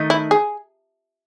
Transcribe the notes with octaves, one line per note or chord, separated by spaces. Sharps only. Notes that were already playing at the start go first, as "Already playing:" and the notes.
Already playing: D#3 A3 D#4
E4
G#4